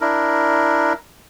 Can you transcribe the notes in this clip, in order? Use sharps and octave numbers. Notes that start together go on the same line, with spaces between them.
D4 E4 A#4